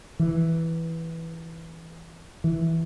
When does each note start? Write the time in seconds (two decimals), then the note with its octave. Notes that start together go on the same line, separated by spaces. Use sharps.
0.19 E3
2.44 E3